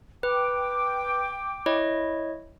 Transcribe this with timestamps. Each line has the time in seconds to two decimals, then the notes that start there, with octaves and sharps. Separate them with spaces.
0.23 B4 G5 D6
1.66 E4 C#5 D#5